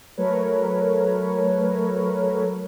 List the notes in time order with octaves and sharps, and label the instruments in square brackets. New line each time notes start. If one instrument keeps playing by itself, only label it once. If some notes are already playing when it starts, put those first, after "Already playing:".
[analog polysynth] F#3 A3 A#4 B4 C#5